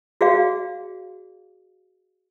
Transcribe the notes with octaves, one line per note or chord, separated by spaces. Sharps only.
F#4 G#4 D5 F5